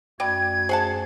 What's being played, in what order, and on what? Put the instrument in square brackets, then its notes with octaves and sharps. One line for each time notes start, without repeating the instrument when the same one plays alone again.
[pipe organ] F#2 A3 F#4 [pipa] D5 [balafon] G5 B5 [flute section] G#6
[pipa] G#4 F#5 A5 [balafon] C5